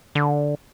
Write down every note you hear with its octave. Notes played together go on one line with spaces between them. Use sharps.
D3